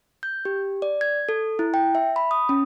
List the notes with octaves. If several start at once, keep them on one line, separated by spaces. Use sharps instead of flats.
G6
G4
D5
G#6
A4
E4
G5
E5
B5
D#6
C#4